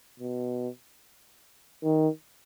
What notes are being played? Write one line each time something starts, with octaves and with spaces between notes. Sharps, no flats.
B2
D#3